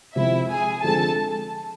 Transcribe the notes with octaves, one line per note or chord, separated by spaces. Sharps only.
C3 F3 G#3 C4 E4 E5
G#4 G#5
D3 F3 G#3 C4 G#4 A4 A5